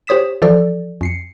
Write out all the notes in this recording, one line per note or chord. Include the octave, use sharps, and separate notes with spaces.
G4 C5 C#5 D#6 B6 E7
E3 F3 A4 D5
F2 C7 C#7